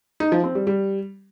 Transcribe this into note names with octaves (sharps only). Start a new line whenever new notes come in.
D#4
F3
C4
G3
G3